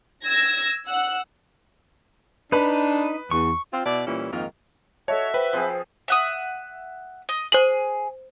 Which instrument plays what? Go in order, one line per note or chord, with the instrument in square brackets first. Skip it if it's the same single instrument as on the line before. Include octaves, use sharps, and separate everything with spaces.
[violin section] E6 G#6 A#6
F#5 E6 F#6
[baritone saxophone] D4 [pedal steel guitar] D#4 B5 [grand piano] B4
[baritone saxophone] E2 [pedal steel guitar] C#6
[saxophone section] C4 F4
B2 E4 D5
A#2 E3 G3 C#4 E4
F2 G#2 D#3 A#3 F4
[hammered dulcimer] F#4 [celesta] A4 D#5 A5 [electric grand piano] C#5 [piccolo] E5
[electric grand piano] B4 [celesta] C5 G5
[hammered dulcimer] F3 C4 G#4
[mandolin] E5 F#5 D#6
D#5
[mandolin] G#4 [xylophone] C5 F#7